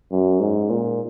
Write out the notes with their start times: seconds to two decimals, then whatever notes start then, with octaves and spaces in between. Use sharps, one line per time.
0.11 F#2
0.40 G#2
0.70 A#2